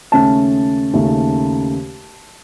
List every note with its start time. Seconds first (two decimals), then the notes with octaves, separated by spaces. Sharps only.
0.12 D#2 C#3 A3 C#4 A5
0.93 D#2 C#3 A3 C#4